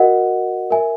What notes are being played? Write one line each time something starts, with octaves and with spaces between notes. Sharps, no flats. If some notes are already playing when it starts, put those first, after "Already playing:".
Already playing: F#4 A#4 D#5 F#5
A#4 E5 G#5